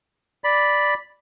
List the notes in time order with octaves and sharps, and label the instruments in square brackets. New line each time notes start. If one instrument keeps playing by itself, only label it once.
[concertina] D5 B5